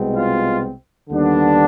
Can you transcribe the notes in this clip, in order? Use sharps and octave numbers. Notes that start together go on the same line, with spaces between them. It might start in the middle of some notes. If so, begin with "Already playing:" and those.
Already playing: C2 B2 G#3 C4
F4
D#2 D3 G3 B3 D4